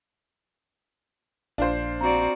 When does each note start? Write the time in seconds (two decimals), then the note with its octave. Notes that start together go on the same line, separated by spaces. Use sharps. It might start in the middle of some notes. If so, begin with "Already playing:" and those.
1.58 A#1 D4 F4 C5
2.01 C4 F#4 D5 A#5